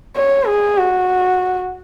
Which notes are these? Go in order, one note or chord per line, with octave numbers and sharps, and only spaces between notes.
C#5
G#4
F#4